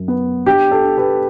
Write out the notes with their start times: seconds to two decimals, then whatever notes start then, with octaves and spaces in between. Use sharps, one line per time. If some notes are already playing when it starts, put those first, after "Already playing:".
Already playing: F#2
0.08 B3
0.46 D4 G4
0.71 A4
0.84 D4
0.98 G4 B4